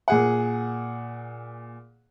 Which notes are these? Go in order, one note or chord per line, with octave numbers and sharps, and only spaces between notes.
A#2 G#4 F#5